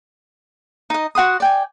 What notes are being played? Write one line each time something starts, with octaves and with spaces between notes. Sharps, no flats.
D#4 D#5
F#4 F#5 C6 D#6
D5 G5 G#5